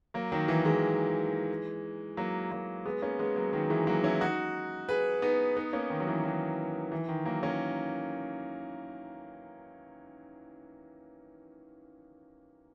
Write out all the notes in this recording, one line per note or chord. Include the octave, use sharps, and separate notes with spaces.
F#3 A#3
D#3 F#3
E3
E3 G#3
F#3 A#3
F#3 A#3
G#3 B3
A#3 C#4
G#3 B3
F#3 A#3
D#3 F#3
E3 G#3
F#3 A#3
C#4 E4
D#4 F#4
G#4 B4
B3 D#4
B3 D#4
A#3 C#4
D#3
F#3
E3
D#3 F#3
E3
D#3
F#3 A#3
A#3 C#4